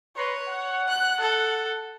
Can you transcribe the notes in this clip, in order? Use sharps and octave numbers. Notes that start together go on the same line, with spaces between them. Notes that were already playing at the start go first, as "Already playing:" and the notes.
B4 C#5 A#5 C6
F#5
F#6
A4